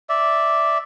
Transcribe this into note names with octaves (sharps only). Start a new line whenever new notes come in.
D5 E5